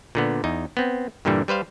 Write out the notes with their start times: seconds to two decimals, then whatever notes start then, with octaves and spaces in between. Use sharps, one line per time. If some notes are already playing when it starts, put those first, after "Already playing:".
0.15 A#2 D3 B3
0.44 E2 D#4
0.77 B3 C4
1.25 G2 A#2 D3 E3 G3
1.48 G3 B4 C5 F5